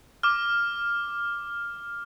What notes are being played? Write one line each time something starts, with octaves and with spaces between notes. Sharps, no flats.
D6 F6